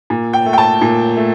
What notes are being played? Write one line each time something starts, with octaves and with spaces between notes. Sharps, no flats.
A#2
G5
A3
G5
A5
A#2
A3